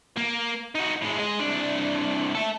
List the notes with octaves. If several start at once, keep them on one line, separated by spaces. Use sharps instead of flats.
A#3
D#4 F#4
A2 G#3
G#3 D#5
C2 D4
A4 E5